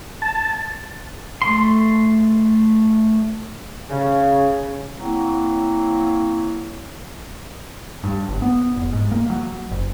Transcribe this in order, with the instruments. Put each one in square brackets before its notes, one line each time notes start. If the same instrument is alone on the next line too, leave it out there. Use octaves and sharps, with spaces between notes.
[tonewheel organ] A5
[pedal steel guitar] A3 C6
[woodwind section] C#3
F#3 A#3 C4 E4
[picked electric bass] G2
G1
B3
F1
G#2
A#3
F#3
F#1